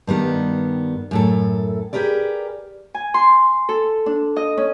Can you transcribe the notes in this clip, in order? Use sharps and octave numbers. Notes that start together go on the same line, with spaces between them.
G2 D#3 G3 B3
F#2 A2 A4
G4 G#4 A#4 B4 D5
G#5
C6
A4
D4
D#5
C#4